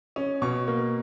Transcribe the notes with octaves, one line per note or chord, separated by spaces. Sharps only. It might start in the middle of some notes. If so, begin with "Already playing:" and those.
C#4
B2 C#6
A#3